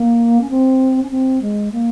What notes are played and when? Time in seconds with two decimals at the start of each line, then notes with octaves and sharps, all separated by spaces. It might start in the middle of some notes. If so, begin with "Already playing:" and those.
Already playing: A#3
0.41 C#4
0.51 C4
1.03 C#4
1.11 C4
1.42 G#3
1.72 A#3